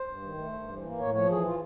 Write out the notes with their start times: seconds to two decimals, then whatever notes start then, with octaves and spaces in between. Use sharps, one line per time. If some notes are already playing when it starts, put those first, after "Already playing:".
Already playing: C5
0.08 G2
0.23 D#3
0.37 A3
0.53 G2
0.69 E3
0.84 A#3
0.98 A2 C#5
1.14 F3 C#5
1.29 E3 G#4
1.45 F4